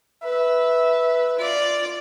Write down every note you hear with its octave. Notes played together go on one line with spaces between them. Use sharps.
B4 E5
F4 D5